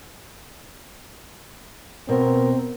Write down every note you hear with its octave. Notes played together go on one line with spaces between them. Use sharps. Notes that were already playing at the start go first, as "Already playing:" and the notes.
B2 C4 A#4